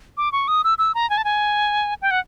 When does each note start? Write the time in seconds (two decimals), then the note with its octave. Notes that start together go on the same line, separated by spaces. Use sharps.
0.17 D6
0.32 C#6
0.48 D#6
0.64 E6
0.78 E6
0.95 A#5
1.10 G#5
1.17 A5
1.24 G#5
2.02 G5
2.11 F#5